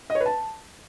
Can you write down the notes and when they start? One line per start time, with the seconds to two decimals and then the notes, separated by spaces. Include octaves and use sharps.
0.10 D#5
0.15 C#5
0.20 B4
0.26 A5